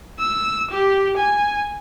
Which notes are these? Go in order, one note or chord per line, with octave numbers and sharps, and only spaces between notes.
E6
G4
G#5